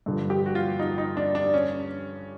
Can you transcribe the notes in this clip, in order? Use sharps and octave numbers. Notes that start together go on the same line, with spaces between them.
G2 D3 F3
G4
F#4
F4
D#4
D#4
D4
D4
C#4